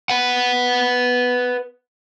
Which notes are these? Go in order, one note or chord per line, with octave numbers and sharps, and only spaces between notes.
B4 F#5